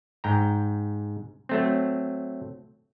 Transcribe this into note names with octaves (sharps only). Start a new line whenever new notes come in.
G#2 G5 A#5
F#3 A3 C4